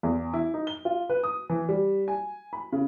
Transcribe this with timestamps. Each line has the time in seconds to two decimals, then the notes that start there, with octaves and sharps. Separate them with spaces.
0.03 E2
0.33 E4
0.54 D#4
0.67 G7
0.85 F4
1.10 B4
1.23 D#6
1.50 E3
1.69 G3
2.08 G#5
2.53 B5
2.72 C#3